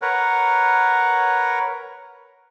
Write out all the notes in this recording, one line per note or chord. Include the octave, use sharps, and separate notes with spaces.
A#4 B4 C#5 F#5